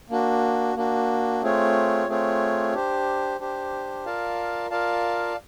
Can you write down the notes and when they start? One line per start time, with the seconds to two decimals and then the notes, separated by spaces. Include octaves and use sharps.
0.10 A#3 D4 F#4
0.76 A#3 D4 F#4
1.42 A3 C4 F4 G#4 C#5
2.07 A3 C4 F4 G#4 C#5
2.74 D4 G4 C5
3.39 D4 G4 C5
4.05 F4 A#4 D5 F5 A5
4.70 F4 A#4 D5 F5 A5